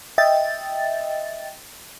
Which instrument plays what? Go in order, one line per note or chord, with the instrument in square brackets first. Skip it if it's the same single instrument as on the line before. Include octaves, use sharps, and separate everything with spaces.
[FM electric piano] D#5 E5 G5 A6